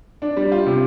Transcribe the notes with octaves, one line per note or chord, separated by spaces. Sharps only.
D4
G3
F4
C3